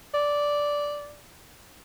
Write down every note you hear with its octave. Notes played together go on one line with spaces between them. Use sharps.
D5